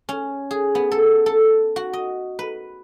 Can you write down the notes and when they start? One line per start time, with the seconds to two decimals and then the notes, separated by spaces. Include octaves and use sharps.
0.09 C#4
0.51 G#4
0.75 B3
0.92 A4
1.26 A4
1.76 F#4
1.93 D#5
2.39 B4